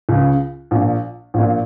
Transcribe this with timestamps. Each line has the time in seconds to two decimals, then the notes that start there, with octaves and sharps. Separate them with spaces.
0.09 C#2 C#3
0.71 A#1 A#2
1.34 A#1 A#2